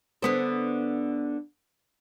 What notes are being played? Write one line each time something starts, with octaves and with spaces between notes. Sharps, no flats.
D3 B3 C5